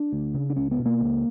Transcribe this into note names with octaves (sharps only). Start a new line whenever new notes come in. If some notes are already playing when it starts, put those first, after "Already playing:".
Already playing: D4
D2
C#3
D4
C#2 C#4
B3
B2
A#3
C#2